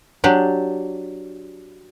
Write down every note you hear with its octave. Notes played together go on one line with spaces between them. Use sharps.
F#3 D4 G4